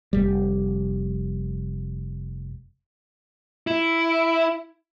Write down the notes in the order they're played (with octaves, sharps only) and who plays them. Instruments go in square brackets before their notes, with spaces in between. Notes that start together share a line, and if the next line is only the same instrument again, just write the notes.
[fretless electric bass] F1 G3
[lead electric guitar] E4